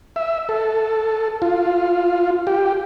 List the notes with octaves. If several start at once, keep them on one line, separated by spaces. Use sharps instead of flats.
E5
A4
F4
G4